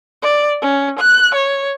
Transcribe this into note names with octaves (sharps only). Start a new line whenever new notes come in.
D5
C#4
F#6
C#5